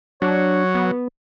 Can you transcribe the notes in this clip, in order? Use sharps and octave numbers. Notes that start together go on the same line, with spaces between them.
F#3 D4 C#5
B3